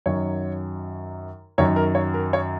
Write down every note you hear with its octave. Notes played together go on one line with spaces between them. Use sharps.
F#2 D#3 F#3 C#5
F#2 D#3 F#3 C#5
A#4
C#5
A#4
C#5